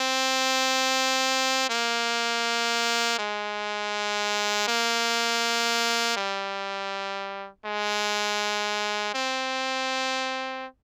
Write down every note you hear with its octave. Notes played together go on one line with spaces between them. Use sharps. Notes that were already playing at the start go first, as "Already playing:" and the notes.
Already playing: C4
A#3
G#3
A#3
G3
G#3
C4